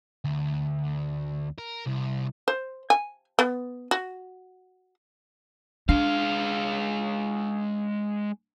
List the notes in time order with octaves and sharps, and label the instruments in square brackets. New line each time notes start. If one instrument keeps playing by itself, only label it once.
[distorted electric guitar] D2
A#4
C2
[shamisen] C5
G#5
B3
F#4
[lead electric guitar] G#3 F5 [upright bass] D4